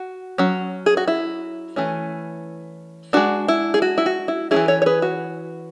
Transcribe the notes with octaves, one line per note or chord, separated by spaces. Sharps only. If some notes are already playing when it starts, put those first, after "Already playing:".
Already playing: F#4
F#3 C#4
G#4
F#4
E4
E3 A3 C#4
G#3 D4 F#4
E4
G#4
F#4
E4
F#4
E4
A3 C#4 E4 G#4
E3
A4 C#5
C#5
G#4 B4
F#4